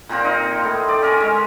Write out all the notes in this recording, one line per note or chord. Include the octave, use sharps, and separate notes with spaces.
A#2 A#3 C4 A#4
D#4 C5
A2
D5
C#4 A#4 G#5
G#3